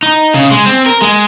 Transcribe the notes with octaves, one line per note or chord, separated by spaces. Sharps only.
D#4
C#3
G#3
C4
A#4
G#3